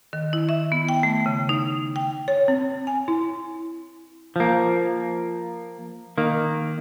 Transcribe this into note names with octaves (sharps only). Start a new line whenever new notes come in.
D#3
E4
E5
B3
G5
A3
C#3
D#4
G5
C#5
C4
G#5
E4
F3 A#3
D#3 A#3